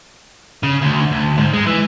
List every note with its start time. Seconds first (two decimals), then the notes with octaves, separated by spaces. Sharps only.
0.63 C#3
0.82 D2
1.12 D2
1.38 G#2
1.54 G#3
1.66 E3